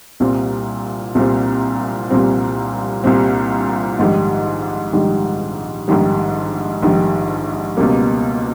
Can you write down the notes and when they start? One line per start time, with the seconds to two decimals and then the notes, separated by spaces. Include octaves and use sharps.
0.20 C2 A#2 G3 C4
1.15 C2 A#2 G3 C4
2.10 C2 A#2 G3 C4
3.04 C2 A#2 G3 C4
3.99 A#1 G#2 D#3 G3
4.93 A#1 G#2 D#3 G3
5.88 A#1 G#2 D#3 G3
6.83 A#1 G#2 D#3 G3
7.77 C#2 B2 G3 A#3